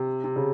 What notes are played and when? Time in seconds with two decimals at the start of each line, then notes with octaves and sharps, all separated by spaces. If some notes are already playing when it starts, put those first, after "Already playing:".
Already playing: C3
0.24 C3
0.36 C#3